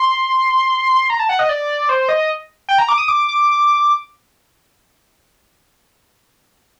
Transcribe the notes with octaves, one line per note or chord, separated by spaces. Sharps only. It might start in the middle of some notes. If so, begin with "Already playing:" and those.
Already playing: C6
A#5
A5
F#5
D#5
D5
C5
D#5
G5
A#5
D6
D#6
D6
D6